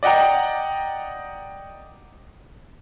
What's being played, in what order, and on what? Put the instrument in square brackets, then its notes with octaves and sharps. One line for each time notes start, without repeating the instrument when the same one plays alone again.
[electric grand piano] D5 D#5 F#5 G5 A#5